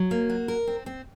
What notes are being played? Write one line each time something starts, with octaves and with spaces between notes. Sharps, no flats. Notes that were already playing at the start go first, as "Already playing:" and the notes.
Already playing: F#3
A#3
F#4
A#4
C4
C4